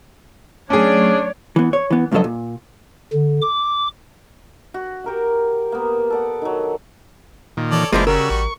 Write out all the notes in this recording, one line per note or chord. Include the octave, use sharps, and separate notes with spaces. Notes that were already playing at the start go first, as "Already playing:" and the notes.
F#3 A3 C#4 D4 G#4 C#5 D5
E3 B3
C#5
E3 B3
C#2 G2 F3 F#3 A4 D#5
A#2
D3
D6
F#4
G4 A#4 F#5
A#3 B3
A4 D5 F#5
D#3 F#3
A#2 D#3
E3 A4 C#5 D5
F#1 E3 F3 G#3 A#3 E4 C5 D5
C#3 G3 F#4 A#4 E6
A1 C#6